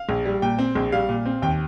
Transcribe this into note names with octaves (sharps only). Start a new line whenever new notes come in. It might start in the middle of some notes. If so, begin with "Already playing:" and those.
Already playing: F5
A#1
G3
A#2 G5
C4
A#1
G3 F5
A#2
C4
D#2 G5